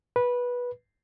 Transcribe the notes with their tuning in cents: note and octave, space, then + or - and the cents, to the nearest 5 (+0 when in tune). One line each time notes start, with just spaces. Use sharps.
B4 -15